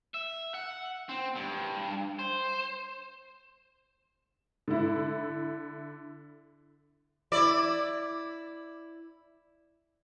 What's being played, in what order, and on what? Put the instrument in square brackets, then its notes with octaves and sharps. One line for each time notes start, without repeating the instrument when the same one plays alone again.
[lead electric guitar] E5
F#5
C4
G2
C5
[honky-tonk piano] D3 E4
[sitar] E4 D5